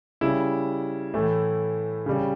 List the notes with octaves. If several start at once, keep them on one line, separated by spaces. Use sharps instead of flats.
C#3 G3 E4
A2 E3 A3
C#3 G3